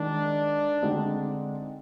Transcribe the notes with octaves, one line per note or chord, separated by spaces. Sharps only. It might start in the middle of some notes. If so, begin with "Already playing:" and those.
Already playing: D#3 G#3 D4 D#4
D3 G#3 C4 D#4